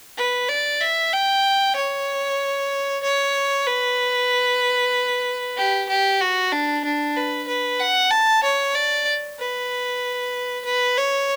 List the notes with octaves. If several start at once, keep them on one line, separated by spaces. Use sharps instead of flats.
B4
D5
E5
G5
C#5
C#5
B4
G4
G4
F#4
D4
D4
B4
B4
F#5
A5
C#5
D5
B4
B4
C#5